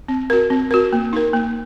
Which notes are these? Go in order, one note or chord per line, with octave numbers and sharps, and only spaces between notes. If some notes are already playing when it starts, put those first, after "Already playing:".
C4
F#4 A#4
C4
F#4 A#4
A#3
D#4 A#4
A#3